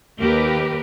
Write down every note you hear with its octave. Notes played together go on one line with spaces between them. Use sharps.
D#2 G4 A#4 B4